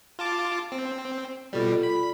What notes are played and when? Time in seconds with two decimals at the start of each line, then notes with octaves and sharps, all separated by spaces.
0.19 F4 A5 D6
0.72 C4
1.53 B2 G3 F4 A4 D5
1.83 B5